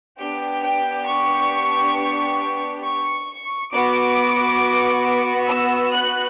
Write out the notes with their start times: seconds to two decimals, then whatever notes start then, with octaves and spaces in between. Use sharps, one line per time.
0.20 B3 D4 G4 G5
0.64 G5
1.08 C#6
2.84 C#6
3.72 B3 F#4 D6
5.49 E6
5.93 F#6